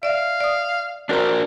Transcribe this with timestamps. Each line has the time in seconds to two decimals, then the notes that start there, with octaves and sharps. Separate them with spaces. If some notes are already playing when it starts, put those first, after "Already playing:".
0.03 D5 E5 F5
0.41 D5 D#6
1.09 D4 F#4 A#4 C5 A#5